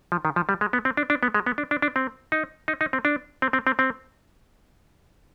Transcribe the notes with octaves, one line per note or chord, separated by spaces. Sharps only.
F3
D#3
F3
G3
G#3
B3
C4
D4
D4
B3
G#3
B3
D4
D4
D4
C4
D#4
D#4
D#4
C4
D4
C4
C4
C4
C4